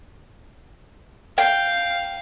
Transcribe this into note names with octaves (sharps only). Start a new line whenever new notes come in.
F5 G5